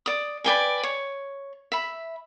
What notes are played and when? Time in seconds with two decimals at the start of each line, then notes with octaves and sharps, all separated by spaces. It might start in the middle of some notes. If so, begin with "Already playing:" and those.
0.06 D5 D#6
0.44 B4 D5 G5 G#5
0.83 C#5
1.72 E5 B5